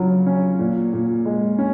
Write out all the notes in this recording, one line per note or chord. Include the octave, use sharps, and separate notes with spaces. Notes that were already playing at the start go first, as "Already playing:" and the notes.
Already playing: C#3 F#3 F4
C#4
A#2
A#2
G#3
C#4